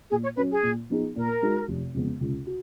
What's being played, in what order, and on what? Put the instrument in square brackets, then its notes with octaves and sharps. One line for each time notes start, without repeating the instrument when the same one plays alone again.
[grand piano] A#2 [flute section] G#4
[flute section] C#5
[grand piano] F#3 C#4 [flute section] B4
[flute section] G#4
[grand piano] A#2
F3 B3 D#4 G#4
[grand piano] A#2 [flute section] A#4
[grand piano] G#3 D#4 F#4
F1
F2 C#3 G#3 B3
C#2
F#4